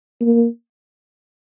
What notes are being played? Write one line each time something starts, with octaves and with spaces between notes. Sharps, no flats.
A#3